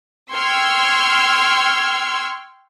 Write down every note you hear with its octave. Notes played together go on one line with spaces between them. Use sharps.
G5 C6 C#6 E6 F6 G#6